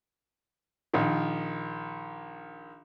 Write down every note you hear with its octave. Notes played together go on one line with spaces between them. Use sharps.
A#1 D#3